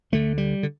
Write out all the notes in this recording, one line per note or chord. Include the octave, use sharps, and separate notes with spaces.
D2 D3 A3
G3
D3